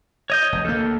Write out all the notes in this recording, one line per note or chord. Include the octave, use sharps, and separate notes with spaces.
C#5 D#5 G6
F1
D2 A#3 A4